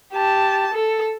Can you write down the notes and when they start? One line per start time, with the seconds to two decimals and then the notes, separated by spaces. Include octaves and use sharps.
0.13 G4 A5
0.73 A4